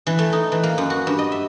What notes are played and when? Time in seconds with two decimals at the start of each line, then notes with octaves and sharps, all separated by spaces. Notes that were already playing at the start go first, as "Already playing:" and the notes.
0.07 E3
0.19 A3
0.33 D#4
0.52 E3
0.63 A#3
0.78 F#2
0.90 F#4
1.07 G2
1.19 D#5
1.32 E5